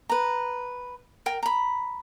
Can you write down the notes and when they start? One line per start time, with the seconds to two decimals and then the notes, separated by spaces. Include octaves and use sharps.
0.09 B4 A#5
1.26 A#4 G5
1.43 A#5 B5